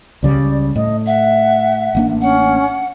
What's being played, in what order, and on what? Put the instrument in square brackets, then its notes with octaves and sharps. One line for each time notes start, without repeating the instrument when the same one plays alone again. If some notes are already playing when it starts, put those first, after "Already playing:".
[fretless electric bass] C#2 C#3 G3 [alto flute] D5
[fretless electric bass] A2 [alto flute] D#5
[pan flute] E5 [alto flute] F#5
[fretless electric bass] A1 A#3 D4
[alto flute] C#4 [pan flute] F#5